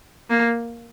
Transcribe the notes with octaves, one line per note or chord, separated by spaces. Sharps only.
A#3